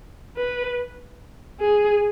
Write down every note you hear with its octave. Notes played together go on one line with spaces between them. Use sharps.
B4
G#4